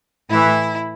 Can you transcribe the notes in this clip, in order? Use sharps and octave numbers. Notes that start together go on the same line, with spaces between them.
A2 E3 E4